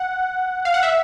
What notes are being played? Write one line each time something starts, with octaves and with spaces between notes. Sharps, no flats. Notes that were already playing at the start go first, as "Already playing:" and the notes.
Already playing: F#5
F5
F#5
E5